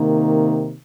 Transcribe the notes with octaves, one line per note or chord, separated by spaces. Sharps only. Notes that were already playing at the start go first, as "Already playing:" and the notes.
Already playing: C3 D#3 A#3